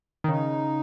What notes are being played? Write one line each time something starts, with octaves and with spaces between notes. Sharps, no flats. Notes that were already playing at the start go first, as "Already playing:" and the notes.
D#3
C#3 D#4